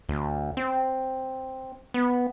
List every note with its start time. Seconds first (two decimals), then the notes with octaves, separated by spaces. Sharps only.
0.09 D2
0.57 C4
1.94 B3